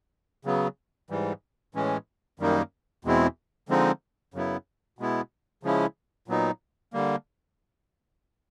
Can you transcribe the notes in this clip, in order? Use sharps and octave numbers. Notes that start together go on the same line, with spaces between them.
C#3 F#3 B3
G#2 E3 G3
A2 E3 G#3 C#4
F#2 D#3 G3 A#3 D#4
E2 B2 G#3 C4 E4
D3 F3 G#3 C4 D#4
F#2 C#3 F#3 B3 E4
B2 G#3 B3 E4
C#3 F3 G#3 C#4 E4
A#2 F#3 B3 D#4
D3 G3 A#3